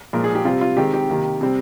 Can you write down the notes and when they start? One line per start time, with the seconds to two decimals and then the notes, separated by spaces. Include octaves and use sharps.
0.13 A#2 F3 G#3 A#4
0.24 G#4
0.35 G4
0.45 C3 G3 C4 F4
0.61 F4
0.77 D#3 G#3 C4 G4
0.94 G4
1.09 C3 D#3 A#3
1.41 C3 G3 C4